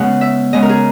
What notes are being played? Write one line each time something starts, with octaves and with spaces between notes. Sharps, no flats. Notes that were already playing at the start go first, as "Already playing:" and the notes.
Already playing: C#3 G#3 B3 F#5
E5
C#3 G#3 B3 D#5
A#4
G#4